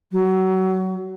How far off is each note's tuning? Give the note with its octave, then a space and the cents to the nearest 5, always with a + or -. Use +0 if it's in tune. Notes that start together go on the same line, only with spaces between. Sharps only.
F#3 +25